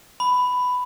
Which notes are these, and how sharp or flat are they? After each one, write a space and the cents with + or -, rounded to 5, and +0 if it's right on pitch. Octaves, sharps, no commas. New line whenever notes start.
B5 +10